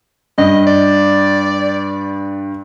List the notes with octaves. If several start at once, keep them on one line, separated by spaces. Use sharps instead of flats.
G2 D#5
D5